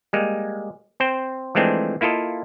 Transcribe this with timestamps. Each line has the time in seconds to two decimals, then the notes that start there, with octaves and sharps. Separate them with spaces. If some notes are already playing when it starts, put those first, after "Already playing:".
0.13 G3 G#3 A#3
1.00 C4 C5 G5
1.55 E3 F3 G#3 A3 C4 D4
2.01 A#3 E4 F4 A4 D#5